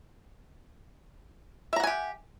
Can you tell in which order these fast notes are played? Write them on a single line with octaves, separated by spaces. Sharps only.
E5 A#5 F#5 G#5 G4